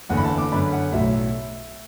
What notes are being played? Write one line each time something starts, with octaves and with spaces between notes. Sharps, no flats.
F#1 E2 D3 F#5
B5
A5
D6
F#2 D3 B3 B5
F#5
B1 A2 F#3 E5